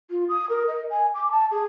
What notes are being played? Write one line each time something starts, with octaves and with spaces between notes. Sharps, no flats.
F4
D#6
A#4
D#5
G#5
D6
A5
G#4